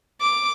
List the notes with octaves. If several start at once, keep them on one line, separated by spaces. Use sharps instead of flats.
D6